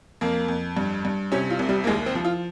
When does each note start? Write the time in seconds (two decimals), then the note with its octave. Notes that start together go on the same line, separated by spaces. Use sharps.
0.21 F2 A#3
0.48 F2
0.77 G2
1.05 G2
1.32 C3 C#4
1.50 F4
1.59 C2
1.69 G3
1.84 A#3
1.87 D#2 G#3
2.06 C4
2.15 F3
2.25 F4